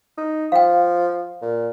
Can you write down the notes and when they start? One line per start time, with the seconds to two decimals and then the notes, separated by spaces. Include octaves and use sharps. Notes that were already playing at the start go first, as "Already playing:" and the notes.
0.18 D#4
0.52 F3 F5 G5
1.42 A#2